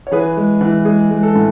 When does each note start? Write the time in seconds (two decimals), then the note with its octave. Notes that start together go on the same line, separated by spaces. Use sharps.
0.07 C#5
0.11 E3 G#4 B4
0.37 G#3
0.61 E3
0.85 G#3 G#4
1.10 G#3
1.23 A4
1.35 A2